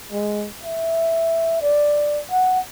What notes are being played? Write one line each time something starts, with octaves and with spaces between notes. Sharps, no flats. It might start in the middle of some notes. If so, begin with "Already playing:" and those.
G#3
E5
D5
F#5